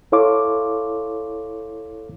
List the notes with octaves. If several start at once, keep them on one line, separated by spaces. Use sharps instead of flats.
E4 A4 C#5 F5 C6 D6